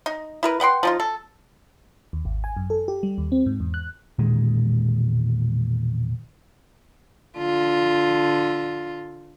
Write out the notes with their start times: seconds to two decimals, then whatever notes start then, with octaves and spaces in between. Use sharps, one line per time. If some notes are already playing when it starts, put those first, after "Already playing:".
0.06 D#4
0.43 E4 A#4 B4
0.60 B4 F#5 G5 C6
0.83 F3 D#4 F4
1.00 A4
2.13 D#2
2.25 G#1
2.44 G#5
2.57 F#2
2.70 A4
2.88 G4
3.03 G3
3.18 D#2
3.32 C4
3.46 G#2
3.60 E2
3.74 F#6
4.19 E1 A#2 D#3 G#3
7.38 D3 F4